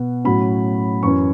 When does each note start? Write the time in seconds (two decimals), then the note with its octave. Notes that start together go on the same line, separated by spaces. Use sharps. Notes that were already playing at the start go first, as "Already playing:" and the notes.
Already playing: B2 B3
0.24 A2 F#3 C#4 B5
1.03 F#2 E3 C#4 C#6